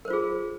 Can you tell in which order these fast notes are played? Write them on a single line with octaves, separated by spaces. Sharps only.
A#4 C5 F4 G#4